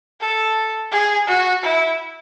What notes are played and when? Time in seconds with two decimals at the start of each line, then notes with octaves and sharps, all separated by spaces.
0.21 A4
0.92 G#4
1.28 F#4
1.64 E4